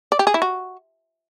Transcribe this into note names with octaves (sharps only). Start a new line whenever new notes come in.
D5
G4
G#4
E4
F#4